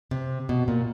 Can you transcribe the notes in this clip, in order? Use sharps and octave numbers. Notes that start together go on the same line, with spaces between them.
C3
B2
A#2